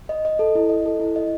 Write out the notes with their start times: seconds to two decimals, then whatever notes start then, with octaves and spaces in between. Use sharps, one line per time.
0.09 D#5
0.25 D#5
0.39 A4
0.55 E4
0.69 D#5
0.86 A4
1.00 E4
1.16 D#5